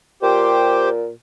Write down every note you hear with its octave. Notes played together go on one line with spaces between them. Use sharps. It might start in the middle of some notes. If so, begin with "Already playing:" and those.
A#2 G4 C5